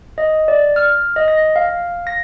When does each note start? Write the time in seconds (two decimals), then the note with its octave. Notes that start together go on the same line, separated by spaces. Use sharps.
0.18 D#5
0.48 D5
0.76 F6
1.16 D#5
1.28 A#6
1.56 F5
2.07 A#6